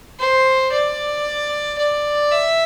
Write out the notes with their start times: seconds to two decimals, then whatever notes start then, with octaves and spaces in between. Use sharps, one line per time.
0.19 C5
0.72 D5
1.78 D5
2.31 E5